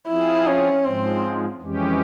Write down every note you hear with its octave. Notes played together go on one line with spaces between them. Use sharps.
F3 C4 E4 F4 G#4
C#4
G#2 F3 G#3 C4
F2 E3 G#3 C#4 G4